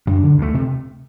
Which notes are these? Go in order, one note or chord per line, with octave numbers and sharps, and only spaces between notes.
F#2 D4
D3
D2 A3
C3